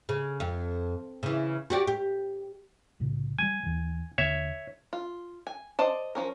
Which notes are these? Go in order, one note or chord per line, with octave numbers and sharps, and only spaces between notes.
C#3
F2
C#3 E3
F#4 G4 D5
G4
C2 A2 C#3
F#3 G3 G#5
D#2 E3
D#2 D3 C#5 E5
F4
G#5
C5 D5 D#5 A5
F3 C#4 A#4